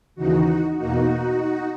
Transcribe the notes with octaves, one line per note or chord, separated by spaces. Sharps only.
D#2 C#3 E3 D#4 F#4
E2 B2 A#3 D#4 F#4